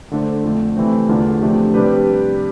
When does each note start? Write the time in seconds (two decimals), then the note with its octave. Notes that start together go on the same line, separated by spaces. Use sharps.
0.11 D3 A3 D4 A4 C5
0.44 F2 D3 A3
0.76 C3 E3 A3 C4
1.09 E2 D3 A3 D4 F4
1.41 C3 F3 A3 D4 G4
1.74 C3 G3 D4 G4 B4